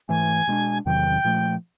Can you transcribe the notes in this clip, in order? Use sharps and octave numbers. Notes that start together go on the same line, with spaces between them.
G#2 E3 A3 G#5
B2 G#3 B3 D4
E2 C3 D#3 F#3 G5
A#2 F3 A3